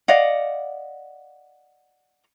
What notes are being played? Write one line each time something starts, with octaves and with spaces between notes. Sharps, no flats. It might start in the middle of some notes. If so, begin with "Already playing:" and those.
D5 D#5 F5 F#5